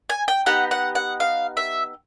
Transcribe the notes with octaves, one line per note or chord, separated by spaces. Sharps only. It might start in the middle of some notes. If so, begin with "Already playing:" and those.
G#5
G5
B3 D#4 G4 F#5
F#5
F#5
F5
E5